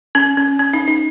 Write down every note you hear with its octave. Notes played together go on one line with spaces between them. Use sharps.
C#4
C#4
C#4
D#4
D#4